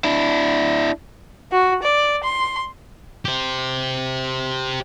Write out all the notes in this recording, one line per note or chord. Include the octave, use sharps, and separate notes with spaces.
D4 E4
F#4
D5
C6
G4 C5